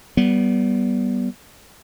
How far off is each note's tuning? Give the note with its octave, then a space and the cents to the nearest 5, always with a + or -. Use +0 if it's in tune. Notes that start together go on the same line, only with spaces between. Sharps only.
G3 -30 B3 -20